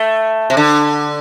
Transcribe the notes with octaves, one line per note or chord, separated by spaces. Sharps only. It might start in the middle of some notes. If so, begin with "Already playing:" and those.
Already playing: A3
C3
D3